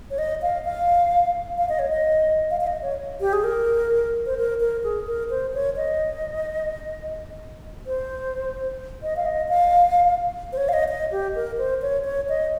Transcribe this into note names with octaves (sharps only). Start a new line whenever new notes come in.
C#5
D#5
F5
F5
F5
D#5
C#5
D#5
F5
F5
D#5
C#5
G4
G#4
A#4
C5
A#4
A#4
G#4
A#4
C5
C#5
D#5
C5
D#5
F5
D#5
F5
C5
C#5
F5
D#5
D#5
G4
A#4
C5
C#5
C#5
D#5